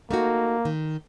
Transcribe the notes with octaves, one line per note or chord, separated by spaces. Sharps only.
A3 A#3 D#4 F#4
D#3